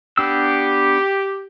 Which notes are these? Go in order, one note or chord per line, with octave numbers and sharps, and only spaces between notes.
B3 D4 G4 E6